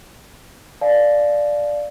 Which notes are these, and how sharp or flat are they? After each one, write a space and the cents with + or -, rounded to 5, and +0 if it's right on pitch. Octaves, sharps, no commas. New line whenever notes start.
D5 +0 F5 +0 A5 -45